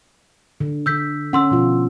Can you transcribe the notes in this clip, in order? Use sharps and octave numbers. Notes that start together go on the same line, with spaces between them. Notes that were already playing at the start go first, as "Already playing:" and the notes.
D3
D3 E6 G6 B6
C#4 F#5 C6 E6
B2 F3 F4